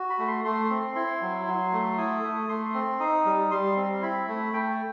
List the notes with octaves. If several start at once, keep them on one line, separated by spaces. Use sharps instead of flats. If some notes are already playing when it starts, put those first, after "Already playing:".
Already playing: F#4
B5
A3
C6
A3 C6
C4
E4 C6
F#3
F#3
A3
E4 D#6
A3
A3 C6
C4
D#4 D#6
G3
G3 C6
C4
E4 B5
A3
A3 G5